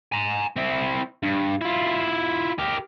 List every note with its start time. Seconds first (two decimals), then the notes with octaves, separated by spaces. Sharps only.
0.12 G#5 A#5
0.56 C4 E4
1.23 G2
1.61 E4 F4
2.59 G4 A#4